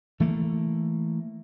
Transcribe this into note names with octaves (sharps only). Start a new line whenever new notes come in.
E3 A3 A#3